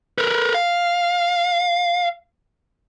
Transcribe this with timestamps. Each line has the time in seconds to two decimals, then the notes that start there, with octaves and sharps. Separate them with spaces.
0.18 A#4 B4
0.55 F5